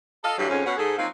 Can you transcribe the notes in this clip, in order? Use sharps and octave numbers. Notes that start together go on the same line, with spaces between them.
A4 D#5 F5
G2 D3 E3 F#3
F2 G#2 C#4
B2 C#4 F#5
G#2 G#4 A4
F3 F#3 A#3 C4 D#4 F4